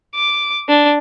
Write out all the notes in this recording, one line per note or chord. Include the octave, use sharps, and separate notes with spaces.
D6
D4